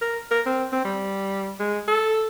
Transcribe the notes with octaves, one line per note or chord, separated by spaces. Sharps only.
A#4
A#4
C4
C4
G3
G#3
A4